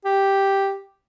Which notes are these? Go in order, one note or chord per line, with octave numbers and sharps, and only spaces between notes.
G4